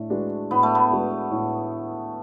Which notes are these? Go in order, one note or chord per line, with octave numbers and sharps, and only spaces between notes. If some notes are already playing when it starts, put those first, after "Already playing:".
Already playing: A2 A3 D4
G#3 D4 F#4 B4
A2 B3
A3
B3
G#3 D4 F#4 B4
A2